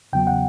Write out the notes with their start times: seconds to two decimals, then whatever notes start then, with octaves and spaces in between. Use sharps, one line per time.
0.13 E2 C#3 F#3 B3 G5
0.27 F#5